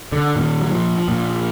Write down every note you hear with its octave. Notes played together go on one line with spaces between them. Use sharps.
D3
A#2 D#3
F#3
F3
A#2